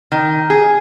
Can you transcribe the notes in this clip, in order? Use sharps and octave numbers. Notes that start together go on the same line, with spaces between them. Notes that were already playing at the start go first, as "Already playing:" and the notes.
D#3
G#4